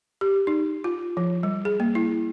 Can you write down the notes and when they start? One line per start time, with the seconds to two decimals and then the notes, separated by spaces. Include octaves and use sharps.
0.21 G4
0.47 D#4
0.84 F4
1.17 F3
1.43 G3
1.65 G#4
1.80 A#3
1.95 E4